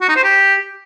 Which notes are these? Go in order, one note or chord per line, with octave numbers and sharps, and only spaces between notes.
F#4
D#4
C5
G4